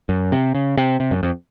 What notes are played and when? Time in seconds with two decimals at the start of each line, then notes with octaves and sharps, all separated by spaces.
0.09 F#2
0.32 C3
0.55 C#3
0.77 C3
1.00 C3
1.11 F#2
1.23 F2